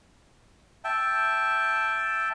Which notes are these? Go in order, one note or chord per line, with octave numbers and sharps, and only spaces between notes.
E5 G5 A5